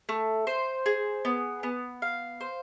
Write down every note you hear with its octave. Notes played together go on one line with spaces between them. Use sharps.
A3
C5
G#4
B3
B3
F5
C5